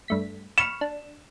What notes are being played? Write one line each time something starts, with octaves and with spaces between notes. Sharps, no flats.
G2 A3 B6
B5 C#6 F6 E7
D4